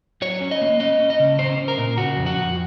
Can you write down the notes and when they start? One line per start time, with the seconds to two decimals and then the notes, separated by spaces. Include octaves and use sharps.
0.22 F#3 C#5
0.41 C#4
0.51 D#5
0.61 A#3
0.80 C#4 D#5
1.00 C#4
1.10 D#5
1.20 C#3
1.39 C#4 C5
1.58 C#4
1.68 A#4
1.78 A#2
1.96 C#3 F#4
2.17 F2
2.26 F#4
2.36 F2